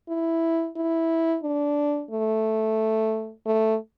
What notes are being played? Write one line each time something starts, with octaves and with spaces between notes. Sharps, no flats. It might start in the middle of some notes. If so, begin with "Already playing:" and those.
E4
E4
D4
A3
A3